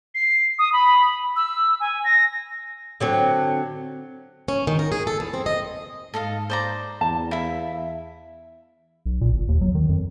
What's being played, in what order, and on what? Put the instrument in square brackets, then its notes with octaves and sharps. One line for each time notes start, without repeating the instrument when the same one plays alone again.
[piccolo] C7
D#6
B5
E6
G#5
A#6
[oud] D3 F#3 C4
[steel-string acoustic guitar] C#4
D#3
A#4
G#4
A4
E2
C4
D#5
[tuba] G#2 [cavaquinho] A4 D#5 F5
[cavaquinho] C5 D5 A#5
[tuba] E2 [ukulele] A5
[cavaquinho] E4 E5 [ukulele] F5
[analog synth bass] B1
A#2
G1
D#2
F#3
D#3
F2